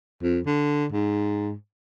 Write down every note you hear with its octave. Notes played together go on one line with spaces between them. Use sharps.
F2
D3
G#2